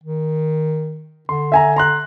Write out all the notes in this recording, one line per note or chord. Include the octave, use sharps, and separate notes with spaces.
D#3
D3 C6
E5 G#5 A#5
A#5 C6 F#6